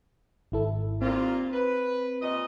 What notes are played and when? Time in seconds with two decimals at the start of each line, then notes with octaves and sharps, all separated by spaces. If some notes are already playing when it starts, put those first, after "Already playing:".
0.52 G#1 E4 A4
1.02 D#2 A#2 C4 F4
1.53 B4
2.22 A#2 G3 D#5